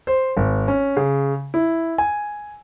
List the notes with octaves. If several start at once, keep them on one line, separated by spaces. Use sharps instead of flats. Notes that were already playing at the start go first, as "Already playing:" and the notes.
C5
G#1
C#4
C#3
E4
G#5